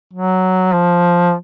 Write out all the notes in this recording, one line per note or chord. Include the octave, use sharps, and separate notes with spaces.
F#3
F3